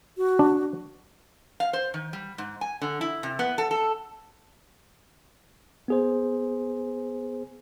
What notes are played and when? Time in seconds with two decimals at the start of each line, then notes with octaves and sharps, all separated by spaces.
0.17 F#4
0.39 D4
1.60 F5
1.73 C5
1.94 D#3
2.13 G3
2.38 G#2
2.61 G#5
2.82 D3
3.01 E4
3.23 C3
3.39 B3
3.58 A4
3.71 A4
5.88 B3 G#4 C5